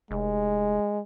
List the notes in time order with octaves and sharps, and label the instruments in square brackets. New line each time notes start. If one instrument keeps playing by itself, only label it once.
[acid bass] F1 [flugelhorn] G#3